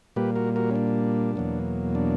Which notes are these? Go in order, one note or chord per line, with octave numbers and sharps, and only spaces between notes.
A#2 G3 A#3 G4 B4
F#4 A#4
F#4 A#4
C#4
D4
E2 B2 F#3 A#3
D4